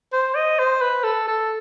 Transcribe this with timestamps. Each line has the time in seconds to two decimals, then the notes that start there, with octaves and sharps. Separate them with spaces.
0.13 C5
0.35 D#5
0.59 C5
0.82 B4
1.04 A4
1.28 A4